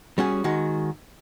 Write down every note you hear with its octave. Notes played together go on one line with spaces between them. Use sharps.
G3 C#4 F#4 G#4
D#3 G#3 F#4